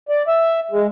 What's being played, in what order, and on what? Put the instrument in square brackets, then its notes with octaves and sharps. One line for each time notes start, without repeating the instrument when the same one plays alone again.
[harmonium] D5
E5
G#3